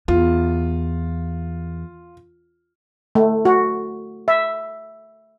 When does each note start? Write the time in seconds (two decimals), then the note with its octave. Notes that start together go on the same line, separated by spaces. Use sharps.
0.08 E2 F4
3.15 A3
3.45 F#4
4.28 E5